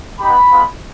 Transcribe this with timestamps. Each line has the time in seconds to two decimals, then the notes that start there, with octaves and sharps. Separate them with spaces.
0.20 B3 D#4 G4 B5
0.51 G#3 B3 F4